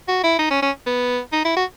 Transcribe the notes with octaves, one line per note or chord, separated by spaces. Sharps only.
F#4
E4
D#4
C#4
C#4
B3
D#4
E4
F#4